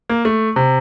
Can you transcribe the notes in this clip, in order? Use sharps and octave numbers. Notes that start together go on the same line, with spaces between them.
A#3
A3
C3